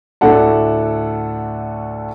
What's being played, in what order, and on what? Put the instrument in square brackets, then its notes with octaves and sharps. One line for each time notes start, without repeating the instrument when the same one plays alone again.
[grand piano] D2 A2 D4 A4 F#5 A5